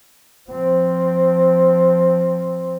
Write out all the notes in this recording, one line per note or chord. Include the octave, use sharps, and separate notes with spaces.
F3 C4